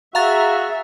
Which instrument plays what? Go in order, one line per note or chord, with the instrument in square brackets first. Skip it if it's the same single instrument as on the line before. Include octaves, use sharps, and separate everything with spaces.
[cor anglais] F#4 [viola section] G#4 E5 [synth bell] F5 A#5 A6